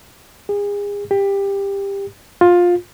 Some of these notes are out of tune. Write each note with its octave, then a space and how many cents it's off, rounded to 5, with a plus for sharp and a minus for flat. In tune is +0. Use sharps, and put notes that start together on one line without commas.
G#4 -35
G4 +20
F4 +15